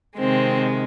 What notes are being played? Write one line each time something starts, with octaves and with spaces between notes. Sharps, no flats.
C3 D#3 G#3 C4